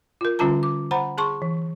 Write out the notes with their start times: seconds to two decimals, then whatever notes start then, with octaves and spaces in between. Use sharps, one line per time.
0.21 F4 A#4
0.39 D3 G3 C#4 F4 A5 A#5
0.63 D6
0.91 C5 F#5 A#5 B5
1.18 G#4 A5 C6 C#6
1.42 E3